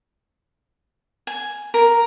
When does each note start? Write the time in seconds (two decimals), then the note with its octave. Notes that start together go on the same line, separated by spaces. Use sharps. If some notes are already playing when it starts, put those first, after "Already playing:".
1.27 G#5
1.74 A#4